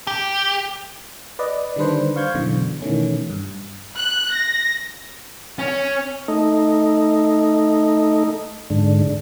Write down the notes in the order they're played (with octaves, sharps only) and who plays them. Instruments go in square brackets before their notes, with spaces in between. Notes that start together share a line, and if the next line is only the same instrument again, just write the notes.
[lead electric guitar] G4
[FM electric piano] B4 D5 D#5
D3 D#3 G3 D4 B4 C5
C5 F5 C#6 G6 G#6
F#2 B2 D3 E3
B2 D#3 E3 A3 C#4
G2
[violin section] F#6
A#6
[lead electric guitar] C#4
[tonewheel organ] A3 D#4
G#2 D3